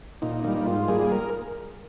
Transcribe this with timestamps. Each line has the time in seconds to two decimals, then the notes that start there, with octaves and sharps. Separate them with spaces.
0.22 A#2 D#4
0.44 G3 A#3 D#4
0.66 G#2 F4
0.88 G3 A#3 G#4
1.12 A#4